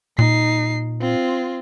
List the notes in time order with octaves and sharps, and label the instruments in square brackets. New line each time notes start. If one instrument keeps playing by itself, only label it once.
[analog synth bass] A#2 [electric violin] D#4 C7
[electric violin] C4 F4